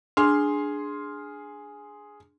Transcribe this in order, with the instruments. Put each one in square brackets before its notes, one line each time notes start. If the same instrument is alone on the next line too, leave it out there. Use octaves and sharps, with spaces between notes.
[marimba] D4 [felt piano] G#4 C6 F6